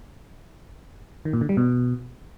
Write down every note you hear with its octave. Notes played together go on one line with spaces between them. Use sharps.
D#3
A#2
D3
G3
B2